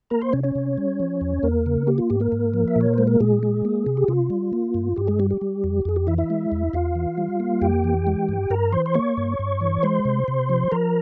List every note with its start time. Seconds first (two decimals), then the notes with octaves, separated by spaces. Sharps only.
0.10 A#3 A#4 A#5
0.21 C5 C6
0.33 C3 C#4 C#5
0.43 C#4 C#5
0.55 C3
0.78 G3
1.00 F3
1.21 E2
1.43 E2 A#3 A#4
1.66 C#3
1.87 A#3 G4
1.98 F4
2.10 G#2 G4
2.20 A#3 A#4
2.32 G#2
2.54 F3
2.68 E5
2.76 A#2 C#5
2.94 G#3 C5
3.07 A#4
3.20 A#2 G#3 G#4
3.43 G#3
3.65 A#3
3.86 C3
3.97 G4
4.08 C3 F4
4.30 G3
4.53 A#3
4.74 G2
4.96 G2 G4
5.07 G#3 G#4
5.19 G3 G4
5.31 G4
5.41 G3
5.64 F2
5.85 F2 G#4
5.96 G4
6.07 E3 E4 E5
6.18 E4 E5
6.30 G#3
6.52 E2
6.73 E2 F4 F5
6.95 E3
7.18 G3
7.40 A#3
7.62 F2 G4 G5
7.84 E3
8.07 G#3
8.29 G2
8.50 G2 A#4 A#5
8.72 E3 C5 C6
8.86 C6
8.94 A#3 C#5 C#6
9.17 G2
9.39 G2
9.61 E3
9.83 G#3 C5 C6
10.05 C3
10.28 C3
10.49 F3
10.72 F3 A#4 A#5